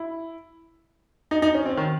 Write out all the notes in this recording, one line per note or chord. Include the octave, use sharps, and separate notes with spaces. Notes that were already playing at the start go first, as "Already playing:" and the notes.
Already playing: E4
D#4
D#4
C#4
C4
D#3